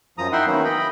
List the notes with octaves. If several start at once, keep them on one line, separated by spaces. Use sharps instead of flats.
F#2 F3 A#5 D#6
D#4 E4 E5 F#5 G5 C6
D#3 F#3 A#3 B3 C#4
D#5 G5 B5